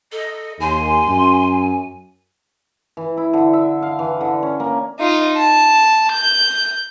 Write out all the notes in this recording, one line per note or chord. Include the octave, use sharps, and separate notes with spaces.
A4 D#5
D#2 G#5 C6
F#2
E3
E4
D3
E5
F5
E3
D3
C#4
A#3
D#4 F4
A5
G6